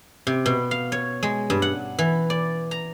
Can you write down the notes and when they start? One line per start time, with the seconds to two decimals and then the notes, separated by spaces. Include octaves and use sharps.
0.27 C3
0.46 B2
0.71 F5
0.92 C#5
1.23 G#3
1.50 G2
1.62 F#5
1.99 E3
2.30 D5
2.71 A#5